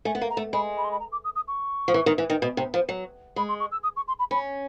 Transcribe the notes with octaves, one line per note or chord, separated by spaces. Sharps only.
A3 G#5
B3
A#3
A#5
A3
G#3 B5
B5
C6
B5
A#5
D6
D#6
D#6
C#6
F3
E3
D#3
E3
D#3
B2
C3
F3
F#3
G#3 B5
C6
C#6
E6
D#6
C#6
C6
B5
C#4 B5